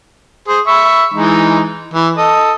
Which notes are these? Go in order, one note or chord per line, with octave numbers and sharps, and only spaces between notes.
G#4 C5
E5 B5 C#6
E3 G#3 D#4
E3
A4 D#5